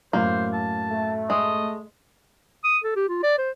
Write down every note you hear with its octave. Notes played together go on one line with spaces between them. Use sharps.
F#2 A2 A#3 C5
A5
A3
G#3 D#5
D#6
A4
G4
F4
D5
C5